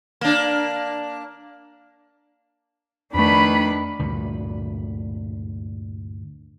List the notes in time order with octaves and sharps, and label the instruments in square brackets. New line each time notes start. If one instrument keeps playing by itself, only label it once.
[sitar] A#3 D4
[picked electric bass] F2 A3 [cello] D#3 B4 [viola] D4 B5
[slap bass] D2 G2 A#2